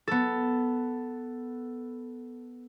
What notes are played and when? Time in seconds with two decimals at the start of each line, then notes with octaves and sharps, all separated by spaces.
0.07 B3 A4